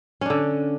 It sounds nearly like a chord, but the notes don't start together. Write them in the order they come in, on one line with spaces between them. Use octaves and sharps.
C#4 D4 D3